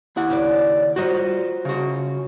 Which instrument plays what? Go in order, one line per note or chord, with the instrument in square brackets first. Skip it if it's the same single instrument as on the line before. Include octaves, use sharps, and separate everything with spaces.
[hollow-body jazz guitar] D#2 E4 F#5
[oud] C#3 B4 D5
[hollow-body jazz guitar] G3 F#4 [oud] F4 C5 D#5
[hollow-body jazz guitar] C#3 F#4